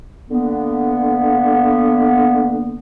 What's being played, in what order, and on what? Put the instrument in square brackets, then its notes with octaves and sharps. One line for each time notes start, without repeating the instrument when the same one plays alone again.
[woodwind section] D3 A#3 B3